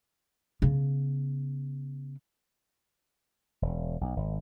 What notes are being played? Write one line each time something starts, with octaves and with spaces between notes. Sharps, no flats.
C#3 B3
E1
B1
G#1